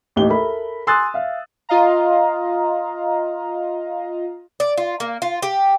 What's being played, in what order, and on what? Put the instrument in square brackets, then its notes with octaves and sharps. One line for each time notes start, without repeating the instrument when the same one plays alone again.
[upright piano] A1 D#2 D#4 G4 G7
A4 A#4 E5 B5
G#5 C6 D#6 E6 F#6 A6
E5 F5
[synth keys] F4 D#5 F5 A#5
[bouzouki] D5
F4
A#3
F4
G4